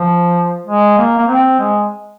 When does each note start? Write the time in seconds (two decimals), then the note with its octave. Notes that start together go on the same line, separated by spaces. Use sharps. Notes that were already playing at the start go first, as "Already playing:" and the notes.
Already playing: F3
0.66 G#3
0.98 A#3
1.18 A#3
1.28 C4
1.59 G#3